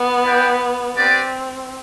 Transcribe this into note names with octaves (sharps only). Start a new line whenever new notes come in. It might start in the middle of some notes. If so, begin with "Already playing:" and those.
Already playing: B3
E4 B4 D5 G5
C4 D4 G4 B4 D5